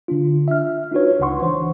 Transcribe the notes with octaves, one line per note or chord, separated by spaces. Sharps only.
D3 D4 F4
E5 F6
D4 D#4 F4 F#4 B4 C#5
C#2 C#3 D4 F#5 C6 C#6
E3 C5